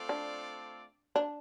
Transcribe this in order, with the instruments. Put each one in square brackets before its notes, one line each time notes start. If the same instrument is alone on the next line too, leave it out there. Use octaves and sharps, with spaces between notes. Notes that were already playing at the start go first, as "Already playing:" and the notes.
Already playing: [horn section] A3 C4 F4 A4 D5
[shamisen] D4
D4